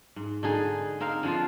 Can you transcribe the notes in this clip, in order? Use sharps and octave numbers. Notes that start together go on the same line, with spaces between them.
G#2
D3 D#4 G#4
C4 D#4 A#4 F5
D3 F3 F4